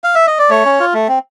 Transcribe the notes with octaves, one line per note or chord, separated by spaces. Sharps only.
F5
E5
D#5
D5
A3 C#5
C#4
F4
A3
C4